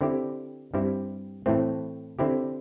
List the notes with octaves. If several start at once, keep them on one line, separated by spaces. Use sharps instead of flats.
D3 C4 E4 G4
G2 G3 C4 E4 G4
A2 E3 A3 C4
D3 C4 E4 G4